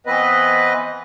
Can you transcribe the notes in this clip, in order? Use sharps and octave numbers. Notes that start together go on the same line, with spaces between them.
E3 B3 C4 B4 D#5